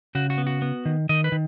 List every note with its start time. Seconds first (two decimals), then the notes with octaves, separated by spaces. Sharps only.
0.15 C#3 F#4
0.30 F#4
0.38 B3
0.47 F#4
0.62 B3
0.85 D#3
1.09 D#3 D#5
1.24 B4
1.32 D#3